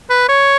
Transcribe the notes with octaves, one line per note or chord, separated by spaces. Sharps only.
B4
C#5